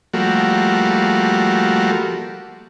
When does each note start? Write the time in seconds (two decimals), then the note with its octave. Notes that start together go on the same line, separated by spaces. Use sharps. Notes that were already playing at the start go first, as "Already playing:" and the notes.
0.14 F3 G3 A3 A#3 F#4